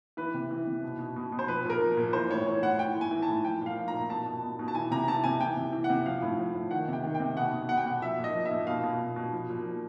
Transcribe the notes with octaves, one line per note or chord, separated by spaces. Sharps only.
E3 B4
C3
E3
C3
B2
B2
B2
B2
C5
F3 B4
A#2 A#4
F3
A#2
E3 C5
A2 C#5
E3 C#5
A2 F#5
E3 G5
A2
G#5
E3
A5
A2
F3 G5
A#2
F5
F3
A#5
A#2
B2 A5
B2
B2
B2
A5
E3 G#5
C3 A#5
E3 A5
C3 G#5
E3 G5
C3
E3
F#5
C3
F3 F5
A2
F3
A2
D#3 F#5
C3 G5
D#3
C3 G5
B2 F#5
B2
B2 F#5
G5
B2 F#5
F3 E5
A#2
D#5
F3
E5
A#2
B2 F5
B2
B2
B2
F3
A#2
F3